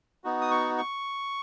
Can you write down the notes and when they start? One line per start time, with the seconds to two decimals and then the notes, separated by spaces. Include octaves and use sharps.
0.24 B3 D#4 F#4
0.41 D#6
0.51 C#6
0.78 C#6